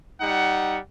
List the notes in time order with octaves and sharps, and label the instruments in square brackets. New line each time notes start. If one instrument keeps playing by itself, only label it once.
[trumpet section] G3 D#4 F#5